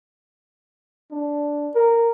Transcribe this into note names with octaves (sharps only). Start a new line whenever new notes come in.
D4
A#4